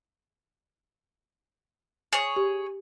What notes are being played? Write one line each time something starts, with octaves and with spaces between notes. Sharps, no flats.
G#4 C#5
G4